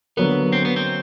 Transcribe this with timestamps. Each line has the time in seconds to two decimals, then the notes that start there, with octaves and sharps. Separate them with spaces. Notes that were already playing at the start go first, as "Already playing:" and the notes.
0.17 D3 F#3 A#3 B3
0.52 C4
0.65 B3
0.76 C4